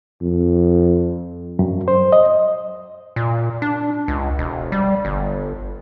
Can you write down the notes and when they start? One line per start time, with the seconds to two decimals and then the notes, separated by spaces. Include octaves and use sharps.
0.22 F2
1.59 F#2
1.88 C5
2.13 D#5
3.16 A#2
3.62 D4
4.08 C#2
4.39 E1
4.72 G3
5.05 G1